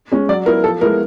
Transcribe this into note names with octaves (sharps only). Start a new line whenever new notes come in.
G#3 C#4
F#3 D5
B3 E4 A#4
F3 A4
G#3 B3 E4 A#4